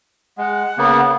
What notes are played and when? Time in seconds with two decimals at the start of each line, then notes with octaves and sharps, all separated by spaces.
0.38 G#3 F#5
0.78 C#3 A#3 B3